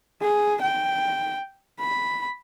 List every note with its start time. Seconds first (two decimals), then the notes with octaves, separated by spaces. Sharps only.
0.22 G#4
0.62 G5
1.80 B5